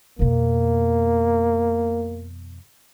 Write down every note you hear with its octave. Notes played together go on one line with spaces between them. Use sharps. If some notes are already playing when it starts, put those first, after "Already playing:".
F2 B2 A#3